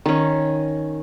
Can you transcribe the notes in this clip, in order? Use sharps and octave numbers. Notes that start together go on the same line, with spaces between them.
D#3 C#4